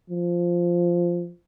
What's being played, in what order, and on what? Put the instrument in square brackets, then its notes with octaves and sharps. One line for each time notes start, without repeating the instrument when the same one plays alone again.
[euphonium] F3